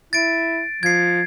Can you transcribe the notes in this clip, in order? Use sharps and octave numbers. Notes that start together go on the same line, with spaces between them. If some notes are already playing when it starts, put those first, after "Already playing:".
E4 A6 D7
F3 G#6 C7